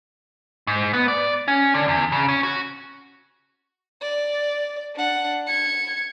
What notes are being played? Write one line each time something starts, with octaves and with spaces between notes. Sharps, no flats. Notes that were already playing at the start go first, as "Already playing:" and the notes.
G#2
B3
D5
C#4
D3
E2
C#3
C#4
F#4
D5
D4 F#5
G#6 C#7